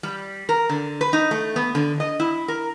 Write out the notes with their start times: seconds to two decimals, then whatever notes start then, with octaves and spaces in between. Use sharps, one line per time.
0.03 G3
0.49 A#4
0.69 D3
1.01 B4
1.13 D#4
1.31 A3
1.56 B3
1.75 D3
2.00 D#5
2.20 E4
2.48 A#4